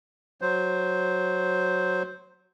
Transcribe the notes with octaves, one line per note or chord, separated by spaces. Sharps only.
F#3 C5